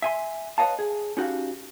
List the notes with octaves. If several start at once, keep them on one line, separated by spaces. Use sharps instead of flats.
E5 G#5 C6
B4 C#5 D#5 F5 A5
G#4
C#4 D#4 F#4 G4 F5